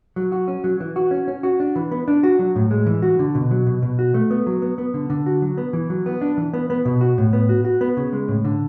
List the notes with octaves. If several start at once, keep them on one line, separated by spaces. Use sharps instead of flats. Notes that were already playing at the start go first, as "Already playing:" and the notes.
F#3
F#4
C#4
F#3
E3
F#4
C#4
C#4
F#4
D4
E3
B3
D4
F#4
F#3
A2
G#3
E3
F#4
D3
B2
F#3
B2
B2
F#4
A3
B3
F#3
B3
B3
D3
D3
F#4
F#3
B3
E3
F#3
B3
D4
E3
B3
B3
B2
F#4
A2
B3
F#4
F#4
B3
C#3
G#3
A2
D3